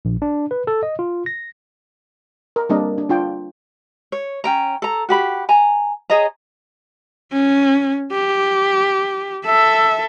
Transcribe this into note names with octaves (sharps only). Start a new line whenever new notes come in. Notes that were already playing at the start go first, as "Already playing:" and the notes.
A#1
D4
B4
A4
D#5
F4
A#6
A#4
G3 A#3 C4 D4 A#4 D#5
D4
D4 F4 G5
C#5
C#4 G5 A#5
A4 A#5
F#4 G4 B5
G#5 A#5
G#4 C#5 D#5 A#5
C#4
G4
A4 E5